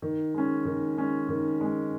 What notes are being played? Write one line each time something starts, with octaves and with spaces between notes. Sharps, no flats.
D#3
G#3 C#4
D#3
G#3 C#4
D#3
G#3 C#4